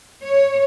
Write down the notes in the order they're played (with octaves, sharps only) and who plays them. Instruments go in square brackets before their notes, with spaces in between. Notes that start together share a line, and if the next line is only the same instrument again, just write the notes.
[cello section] C#5